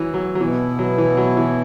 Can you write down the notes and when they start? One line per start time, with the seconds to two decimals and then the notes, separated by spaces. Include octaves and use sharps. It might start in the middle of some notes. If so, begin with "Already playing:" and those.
Already playing: E3 F#3
0.14 F#3
0.35 F#3
0.40 B2 E3 B3 E4
0.79 F#3
0.98 E3
1.17 F#3
1.37 E3